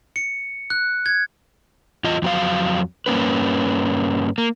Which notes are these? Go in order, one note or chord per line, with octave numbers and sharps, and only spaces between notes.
C#7
F#6
G#6
E2 F4 D#5
F2 F#3 F#4 F5
G2 A#3 C#4 B4
A#3